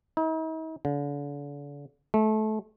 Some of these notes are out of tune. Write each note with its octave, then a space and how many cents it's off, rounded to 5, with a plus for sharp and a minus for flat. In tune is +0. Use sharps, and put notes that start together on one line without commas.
D#4 +45
D3 -40
A3 -25